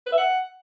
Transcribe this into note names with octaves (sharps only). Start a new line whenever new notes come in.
B4
E5
F#5